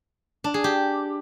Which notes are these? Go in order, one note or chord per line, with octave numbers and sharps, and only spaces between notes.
D4
G#4
G4